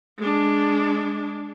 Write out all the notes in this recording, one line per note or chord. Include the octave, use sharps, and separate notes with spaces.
G#3 D4